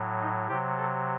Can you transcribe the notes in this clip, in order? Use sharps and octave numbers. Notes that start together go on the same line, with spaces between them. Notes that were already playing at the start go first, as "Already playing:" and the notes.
Already playing: A2 F#3
D#4
C3 F#3 G4
A4